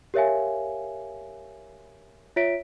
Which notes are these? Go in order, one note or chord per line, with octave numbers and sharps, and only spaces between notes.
G4 A#4 C#5 E5 F5 G#5
F4 C#5 E5 B6 D7